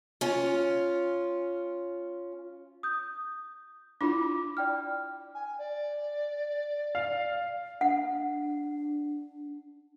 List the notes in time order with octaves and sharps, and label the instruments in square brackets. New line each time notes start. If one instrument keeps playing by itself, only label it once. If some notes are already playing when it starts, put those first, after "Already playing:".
[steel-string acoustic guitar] C#4 F4
[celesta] D#6 G6
[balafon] D4 E4 F4 [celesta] B5 D6
[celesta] D5 G5 F6
[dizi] G#5
D5
[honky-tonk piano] F5
[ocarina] D4 [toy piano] F#5